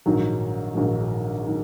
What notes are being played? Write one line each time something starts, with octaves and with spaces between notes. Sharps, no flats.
A#1 G#2 D#3 F#3
A#1 G#2 D#3 F#3
D#3 F#3